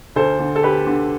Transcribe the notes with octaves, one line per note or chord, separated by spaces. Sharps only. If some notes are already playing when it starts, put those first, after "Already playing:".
D2 A4 C5
D3
A4
D2 G4 B4
D3